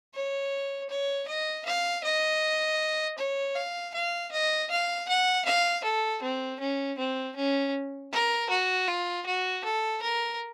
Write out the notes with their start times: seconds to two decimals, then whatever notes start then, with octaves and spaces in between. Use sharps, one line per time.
0.14 C#5
0.89 C#5
1.28 D#5
1.66 F5
2.04 D#5
3.18 C#5
3.55 F5
3.94 F5
4.32 D#5
4.71 F5
5.09 F#5
5.46 F5
5.84 A4
6.22 C4
6.60 C#4
6.98 C4
7.36 C#4
8.12 A#4
8.50 F#4
8.88 F4
9.26 F#4
9.65 A4
10.02 A#4